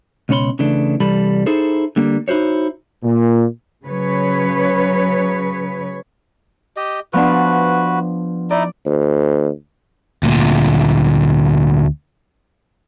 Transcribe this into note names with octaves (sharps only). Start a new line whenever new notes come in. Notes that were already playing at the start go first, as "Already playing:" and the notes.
C#2 B2 C#4 C#5 B5 C6
C#3 E3 A3 D4
C2 E3 G3 A4 B5
D#4 E4 G#4 A4 C5
D3 G3 A#3
D#4 E4 F#4 C5 C#5
A#2
C#3 F#3 B4 C#5
G4 D#5
F3 B3 D4 F#4 B4
D#4 E4 D5 D#5
D2
D2 A#2